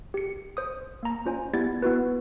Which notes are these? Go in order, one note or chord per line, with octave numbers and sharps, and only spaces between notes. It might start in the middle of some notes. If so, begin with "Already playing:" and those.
G4 C#7
C5 D#6
A#3 A#5
C#4 F4 C5 D5 G#5
B3 E4 G4 D5 G#6 A6
B3 E4 F#4 B4